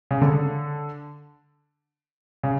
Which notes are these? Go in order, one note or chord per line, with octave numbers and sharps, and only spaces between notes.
C#3
D3
C#3